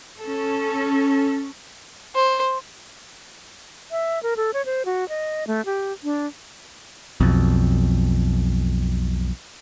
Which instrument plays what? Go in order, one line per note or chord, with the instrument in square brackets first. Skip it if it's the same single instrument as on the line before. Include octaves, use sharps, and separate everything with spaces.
[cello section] C#4 A4
[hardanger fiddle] C5
[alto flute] E5
A#4
A4
C#5
C5
F#4
D#5
A3
G4
D4
[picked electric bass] B1 F2